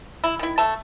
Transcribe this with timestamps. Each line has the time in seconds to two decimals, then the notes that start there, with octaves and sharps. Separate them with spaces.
0.24 E4
0.39 D#3 E4
0.58 A3 A5